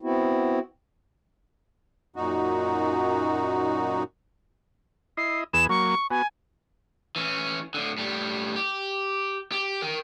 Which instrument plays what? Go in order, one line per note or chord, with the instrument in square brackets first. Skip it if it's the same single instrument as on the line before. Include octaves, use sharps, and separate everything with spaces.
[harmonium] B3 C4 E4 F#4
[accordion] F#2 A#2 D#4 F#4
[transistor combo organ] E4 D#5 [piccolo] C7
[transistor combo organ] E2 B3 G#4 [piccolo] E7
[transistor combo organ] F#3 A#3 [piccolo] C#6
[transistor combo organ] B3 F#4 [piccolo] G#5
[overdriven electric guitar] E3 C#4
A2 D3
A2 G3
G4
G4
A#4 G5